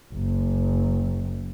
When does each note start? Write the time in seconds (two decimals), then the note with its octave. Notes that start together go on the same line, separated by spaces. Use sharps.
0.14 F#1